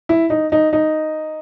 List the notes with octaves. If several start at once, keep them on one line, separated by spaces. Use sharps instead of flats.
E4
D#4
D#4
D#4